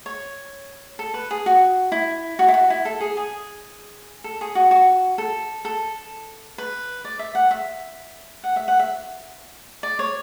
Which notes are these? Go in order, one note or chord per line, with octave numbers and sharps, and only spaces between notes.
C#5
A4
B4
G#4
F#4
E4
F#4
E4
F#4
E4
A4
G#4
G#4
A4
G#4
F#4
F#4
A4
A4
B4
D5
E5
F#5
E5
F#5
E5
F#5
E5
D5
C#5